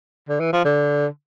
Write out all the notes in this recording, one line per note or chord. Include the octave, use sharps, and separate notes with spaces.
D3
E3
F3
D3